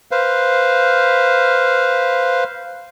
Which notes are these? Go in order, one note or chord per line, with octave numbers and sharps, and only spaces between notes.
B4 C5 F5